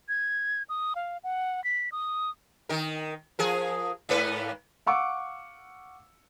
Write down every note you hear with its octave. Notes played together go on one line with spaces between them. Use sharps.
G#6
D#6
F5
F#5
B6
D#6
D#3 A#4
F3 G#4 A#4
G#2 A#3 B4
F5 F#5 C#6 D6 E6